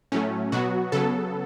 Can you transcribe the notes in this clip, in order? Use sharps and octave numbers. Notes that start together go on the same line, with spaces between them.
A2 F#3 A3 C#4
B2 F#3 B3 F#4
C#3 F#3 B3 A4